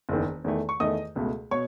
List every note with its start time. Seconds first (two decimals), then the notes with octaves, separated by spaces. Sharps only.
0.09 F#1 E2 D#3
0.44 E2 D#3 A3
0.69 C#6
0.80 E2 D#3 A3 D#5 D#6
1.16 C#2 B2 A3
1.51 B2 C#5 C#6